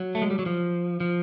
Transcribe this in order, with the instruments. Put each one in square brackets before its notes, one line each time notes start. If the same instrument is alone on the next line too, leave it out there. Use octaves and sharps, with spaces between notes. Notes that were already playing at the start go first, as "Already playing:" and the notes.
Already playing: [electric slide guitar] F#3
A3
G#3
G3
F#3
F3
F3